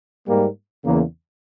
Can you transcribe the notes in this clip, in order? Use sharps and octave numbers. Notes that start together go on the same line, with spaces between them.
G#2 G3 A#3
E2 C#3 E3 A#3